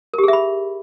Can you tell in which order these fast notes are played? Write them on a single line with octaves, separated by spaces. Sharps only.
A#4 G4 G#4 E5 B5